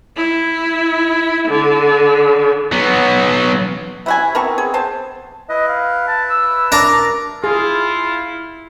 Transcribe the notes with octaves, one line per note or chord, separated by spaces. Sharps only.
E4
D3
F#3 B3
C3 E4 F#4 E5 G#5
B3 C4 A#4 A5 C#6
G#4
C5 A5
E4 B4 D#5
F5
A5
E6
D4 A#4 A#5
E4 F4 G#4